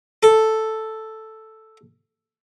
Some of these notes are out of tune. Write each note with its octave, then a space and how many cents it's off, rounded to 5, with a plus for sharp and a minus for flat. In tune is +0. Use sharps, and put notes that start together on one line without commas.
A4 +0